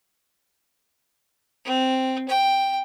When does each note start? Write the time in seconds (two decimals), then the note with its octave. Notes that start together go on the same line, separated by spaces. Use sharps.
1.65 C4
2.28 G5